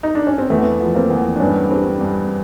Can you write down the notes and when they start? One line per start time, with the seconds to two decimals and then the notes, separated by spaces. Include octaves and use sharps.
0.03 D#4
0.15 D4
0.27 C#4
0.38 C4
0.50 E2 A3 B3
0.80 F3
0.95 A#3 C4
1.10 E2
1.36 D4
1.40 G2 B3 C#4
1.70 G3 C4 D4
2.01 G2